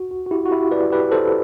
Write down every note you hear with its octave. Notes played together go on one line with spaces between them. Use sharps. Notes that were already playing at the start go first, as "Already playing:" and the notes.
Already playing: F#4
F#4
F#4
E4 G4
F#4
E4 G4
B4 D5
G4 B4
A4 C5